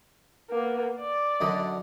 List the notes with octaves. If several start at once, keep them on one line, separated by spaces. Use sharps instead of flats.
A#3 B3
D5
F#2 D3 D#5